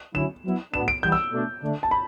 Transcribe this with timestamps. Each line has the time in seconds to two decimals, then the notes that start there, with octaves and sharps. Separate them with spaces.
0.14 D3 F#3 C#4 E4 E7
0.44 F#3 B3 E4
0.73 A2 F#3 B3 D4 E7
0.88 D7
1.03 E3 G3 B3 G6
1.12 E6
1.32 B2 A3 D4
1.62 D3 A3 D4
1.83 A5
1.91 B5